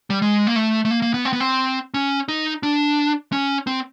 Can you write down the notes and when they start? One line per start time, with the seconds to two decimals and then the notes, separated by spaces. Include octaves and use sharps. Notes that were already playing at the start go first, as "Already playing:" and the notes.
0.10 G3
0.22 G#3
0.47 A#3
0.56 A3
0.85 A3
0.91 A#3
1.02 A#3
1.14 B3
1.25 C4
1.33 B3
1.40 C4
1.94 C#4
2.28 D#4
2.63 D4
3.32 C#4
3.67 C4